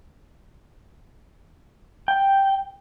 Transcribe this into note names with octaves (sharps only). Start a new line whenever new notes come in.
G5